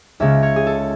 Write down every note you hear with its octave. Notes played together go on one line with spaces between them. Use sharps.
C#2 C#3 G#3 C#4 E5
C#5
G#4
A4